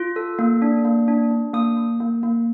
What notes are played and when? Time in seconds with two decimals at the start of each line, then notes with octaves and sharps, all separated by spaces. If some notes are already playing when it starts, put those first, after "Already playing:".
Already playing: F4
0.16 A4
0.39 A#3
0.62 D4
0.85 A#3
1.08 D4
1.31 D4
1.53 A#3 D#6
1.77 A#3
2.01 A#3
2.23 A#3